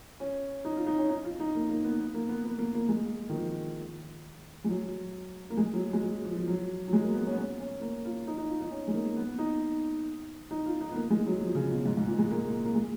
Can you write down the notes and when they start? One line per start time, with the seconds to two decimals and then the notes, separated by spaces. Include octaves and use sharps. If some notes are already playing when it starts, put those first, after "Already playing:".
0.20 C#4
0.65 D#4
0.77 F4
0.87 D#4
0.98 C#4
1.09 D#4
1.24 F4
1.40 D#4
1.55 A#3
1.69 A#3
1.84 B3
1.99 B3
2.14 A#3
2.29 B3
2.45 B3
2.58 A#3
2.74 A#3
2.89 G#3
3.29 D#3
3.33 F3
4.64 G#3
4.69 F#3
5.50 A#3
5.57 G#3
5.73 F#3
5.93 G#3
6.03 F#3
6.25 F3
6.36 F3
6.48 F#3
6.88 F#3
6.93 G#3
7.03 A#3
7.14 B3
7.26 C#4
7.32 B3
7.37 C#4
7.60 C#4
7.81 A#3
8.05 F4
8.27 D#4
8.38 D#4
8.49 F4
8.60 D#4
8.71 C#4
8.88 G#3
8.94 A#3
9.16 B3
9.28 B3
9.38 D#4
10.51 D#4
10.66 F4
10.81 D#4
10.92 B3
10.96 A#3
11.10 G#3
11.26 F#3
11.41 F3
11.55 C#3
11.71 B2
11.86 G#2
11.97 G#2
12.07 A#2
12.19 G#3
12.30 A#3
12.65 A#3
12.75 G#3